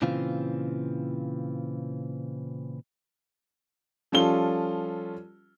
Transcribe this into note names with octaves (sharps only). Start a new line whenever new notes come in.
A#2 C#3 E3 C4 F4
F3 G3 C#4 F4 A4 G7